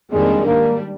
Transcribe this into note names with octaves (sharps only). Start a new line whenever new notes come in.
F2 D#3 G3 G#3 A#3 D4
G#2 G3 A#3 D4